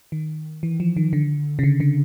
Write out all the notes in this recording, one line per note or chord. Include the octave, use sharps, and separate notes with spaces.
D#3
E3
F3
D#3
D3
C#3
D3
D3